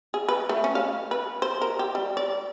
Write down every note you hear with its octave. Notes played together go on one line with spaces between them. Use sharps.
G#4
B4
A3
C#4
F5
B4
C5
A#4
G4
G3
D5